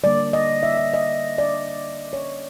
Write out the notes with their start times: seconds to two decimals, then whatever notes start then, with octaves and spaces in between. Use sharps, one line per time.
0.03 D3 G3 A#3 D5
0.33 D#5
0.63 E5
0.77 E5
0.94 D#5
1.38 D5
2.13 C#5